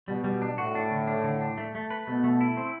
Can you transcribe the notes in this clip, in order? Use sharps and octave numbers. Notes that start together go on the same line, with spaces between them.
B2 G3
G3
D4
A2 F#4
D4
D3
D4
D3
D4
A3
A3
B4
B2 A3
A3
E4
C4